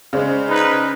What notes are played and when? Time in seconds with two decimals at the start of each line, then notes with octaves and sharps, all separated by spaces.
0.13 C#3 G#3 C5 D5 F5
0.49 D#4 B4